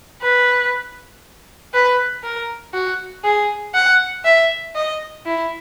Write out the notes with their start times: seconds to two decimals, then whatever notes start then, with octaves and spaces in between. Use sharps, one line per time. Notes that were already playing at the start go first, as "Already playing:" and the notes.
0.22 B4
1.74 B4
2.23 A#4
2.74 F#4
3.24 G#4
3.74 F#5
4.24 E5
4.75 D#5
5.26 E4